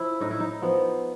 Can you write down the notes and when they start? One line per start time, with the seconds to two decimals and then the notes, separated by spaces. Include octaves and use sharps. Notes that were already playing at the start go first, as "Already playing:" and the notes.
Already playing: F3 E4
0.20 A2 D#4
0.31 E4
0.40 D#4
0.62 F3 B3